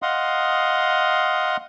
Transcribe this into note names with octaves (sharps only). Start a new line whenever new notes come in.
D#5 F5 F#5 C6 D#6